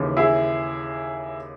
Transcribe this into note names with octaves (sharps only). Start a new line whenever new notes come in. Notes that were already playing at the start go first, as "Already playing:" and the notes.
Already playing: D#2 C#3 E3
E4 G#4